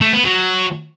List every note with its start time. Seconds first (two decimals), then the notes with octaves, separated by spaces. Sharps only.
0.01 A3
0.13 B3
0.24 F#3